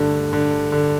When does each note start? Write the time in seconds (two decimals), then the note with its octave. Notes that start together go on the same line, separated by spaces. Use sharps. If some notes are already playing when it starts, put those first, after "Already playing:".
Already playing: G2 D3 A3
0.33 D3
0.72 D3